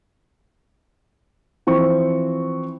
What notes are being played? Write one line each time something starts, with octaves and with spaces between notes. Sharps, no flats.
E3 F3 C4 C#6